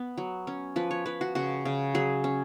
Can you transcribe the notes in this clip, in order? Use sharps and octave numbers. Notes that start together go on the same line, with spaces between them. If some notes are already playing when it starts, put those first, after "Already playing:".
Already playing: B3
F#3
C#4
F3 B4
C#5
F3 B4
F#4
C#3 F#4
C#3
F#3 G#4
C#4